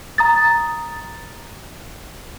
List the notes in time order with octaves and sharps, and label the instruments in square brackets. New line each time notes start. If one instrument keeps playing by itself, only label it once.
[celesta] A#5 D#6 A6